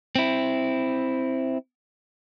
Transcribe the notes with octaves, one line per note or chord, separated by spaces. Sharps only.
C4 E4